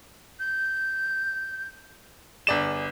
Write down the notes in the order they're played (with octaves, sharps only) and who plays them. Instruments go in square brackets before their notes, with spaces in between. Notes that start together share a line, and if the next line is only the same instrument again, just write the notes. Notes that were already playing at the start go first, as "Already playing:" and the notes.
[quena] G6
[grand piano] G1 D5 E7 [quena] G#4